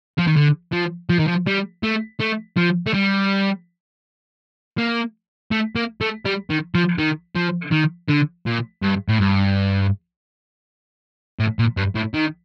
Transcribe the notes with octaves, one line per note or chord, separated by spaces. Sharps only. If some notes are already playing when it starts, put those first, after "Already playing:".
F3
D#3
D3
F3
F3
D#3
F3
G3
A3
A3
F3
A3
G3
A#3
A3
A#3
A3
G3
D#3
F3
D#3
F3
D#3
D3
A#2
G2
A2
G2
A2
A#2
G2
A2
D#3